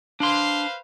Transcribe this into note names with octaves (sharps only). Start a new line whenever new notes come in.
D4 B4 C5 F5 C6